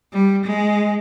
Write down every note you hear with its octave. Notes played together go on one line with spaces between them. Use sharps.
G3
G#3